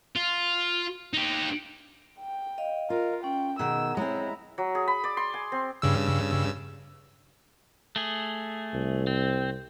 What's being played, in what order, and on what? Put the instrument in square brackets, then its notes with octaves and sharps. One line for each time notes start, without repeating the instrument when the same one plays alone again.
[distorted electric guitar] F4
D#4 G4
[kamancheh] G5
[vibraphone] D#5 F5
[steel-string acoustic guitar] F4 [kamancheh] A#4
[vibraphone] C#4 [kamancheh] G5
[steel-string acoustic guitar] B2 D#3 [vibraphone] G#4 F#5 A#5 [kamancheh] E6
[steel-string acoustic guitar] G#3 C4 [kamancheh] E4 A#5 [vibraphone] C#5
[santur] F#3
G#4
B5
D5
C6
G#5
C4
[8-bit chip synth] G2 C#3 E6
[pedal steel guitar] A3 G#4
[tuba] C2
[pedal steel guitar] C4